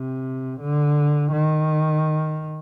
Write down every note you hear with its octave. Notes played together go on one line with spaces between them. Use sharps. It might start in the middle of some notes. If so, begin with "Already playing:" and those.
Already playing: C3
D3
D#3